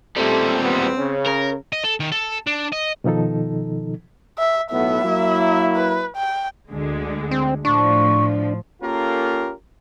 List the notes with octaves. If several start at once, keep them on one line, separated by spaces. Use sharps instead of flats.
A#2 G3 A3 C4 G4 A4
E2 B3
C#3 C#4
A#4
D#5
A4
D#3
A4
D4
D#5
B2 D#3 F3 D#4 A4
E5
B1 A2 B3 E5
F#3 A#3 E4
B4
G5
D2 D3 G#3
C4
A2 F3 D4 C#6
A#3 C#4 F4 G4 A4 A#4